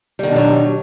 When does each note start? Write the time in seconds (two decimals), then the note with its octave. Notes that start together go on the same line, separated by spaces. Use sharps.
0.19 G3
0.23 D#3
0.27 B2
0.31 D4
0.36 F#3